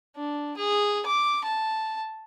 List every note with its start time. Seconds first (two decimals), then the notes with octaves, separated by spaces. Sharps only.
0.16 D4
0.57 G#4
1.06 D6
1.45 A5